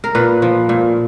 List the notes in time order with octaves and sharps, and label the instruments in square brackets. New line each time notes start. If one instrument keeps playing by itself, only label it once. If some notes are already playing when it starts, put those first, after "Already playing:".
[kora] A#4
A#2 B4
F3
A#2